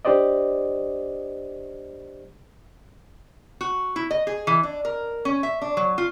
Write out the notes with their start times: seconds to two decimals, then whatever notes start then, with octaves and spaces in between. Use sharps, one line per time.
0.05 D4 G4 C5 D5 D#5
3.61 F#4
3.96 E4
4.11 D#5
4.27 G#4
4.47 E3
4.63 D4
4.85 A#4
5.25 C#4
5.43 E5
5.62 D4
5.77 F#3
5.98 F4